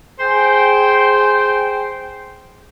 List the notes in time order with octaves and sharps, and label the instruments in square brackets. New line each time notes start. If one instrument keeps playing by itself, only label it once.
[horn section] G#4 C5 G5